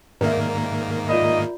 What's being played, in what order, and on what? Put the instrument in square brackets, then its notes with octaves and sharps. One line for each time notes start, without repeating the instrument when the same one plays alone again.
[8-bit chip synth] G#2 D#3 A#3 [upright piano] A#4 E5 [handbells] D5
[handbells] F4 D5 B5 [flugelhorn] D#5